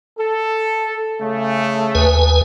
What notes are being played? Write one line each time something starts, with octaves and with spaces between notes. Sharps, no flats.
A4
C#3 A3
D#2 B4 G#5